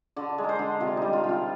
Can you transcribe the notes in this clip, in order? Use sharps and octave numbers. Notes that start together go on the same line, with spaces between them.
D3 D5
G#3
A#4
C5
D3
C3 F4
G3 D#4
F4
C3
F4